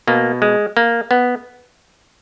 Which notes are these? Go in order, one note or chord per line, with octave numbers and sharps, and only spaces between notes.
B2 A#3
G#3
A#3
B3